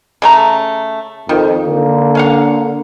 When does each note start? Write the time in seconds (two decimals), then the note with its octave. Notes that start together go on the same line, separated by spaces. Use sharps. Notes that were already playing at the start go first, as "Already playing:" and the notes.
0.22 C#3 A3 A#5
1.29 F2 D#3
1.65 D3 A#3
2.15 C#4 F5 F#5